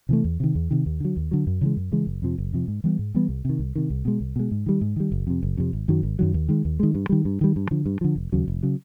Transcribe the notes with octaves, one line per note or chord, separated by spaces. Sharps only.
C3 E3 A3
E2
C3 D#3
E2
C3 D#3
D#2
D3 F#3
D#2
D3 F#3
F#2
C#3 E3 G#3
F#2
C#3 E3 G#3
F#1
F2 C3 F3
F#1
F2 C3 F3
G#2
E3 G3 B3
G#2
E3 G3 B3
C2
C3 D#3
C2
C3 D#3
C2
B2 G#3
C2
B2 G#3
G#2
D#3 G3
G#2
D#3 G3
F#1
F2 C3
F#1
F2 C3
G#1
F#2 D#3 F#3
G#1
F#2 D#3 F#3
D#2
D#3 G#3
D#2
D#3 G#3
G2
D#3 G3
G2
D#3 G3
G2
D3 F3
G2
D3 F3
F1
D#2 C#3 F#3
F1
C#3 F#3